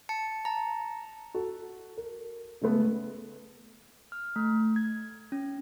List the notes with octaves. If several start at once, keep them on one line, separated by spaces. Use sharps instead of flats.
A5 C#7
A5 A#5
F#4 A4
A#4
C#3 G#3 A3 B3
F6
A3
G#6
C#4